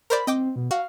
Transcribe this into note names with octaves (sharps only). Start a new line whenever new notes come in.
A#4 C5 D5 B5
C4 D#5 G5 D6
B2
F#4 F5